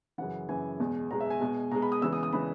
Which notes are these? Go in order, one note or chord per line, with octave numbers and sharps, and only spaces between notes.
F#2 C#3 E3 F#5
F#2 C#3 E3 G#5
E2 B2 G#3
E2 B2 G#3 A#5
E5
G#5
B2 G#3
B2 G#3 A#5
B5
D#6
E2 C#3 E3 G#3 E6
D#6
D#6
C#3 E3 G#3 B5